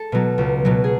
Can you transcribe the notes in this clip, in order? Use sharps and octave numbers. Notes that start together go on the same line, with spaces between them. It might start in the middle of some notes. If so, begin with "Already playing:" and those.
Already playing: A4
B2 F#3
C#2
B2 F#3
G#4